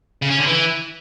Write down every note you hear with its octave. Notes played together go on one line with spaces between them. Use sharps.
C#3
C#4
D3
E3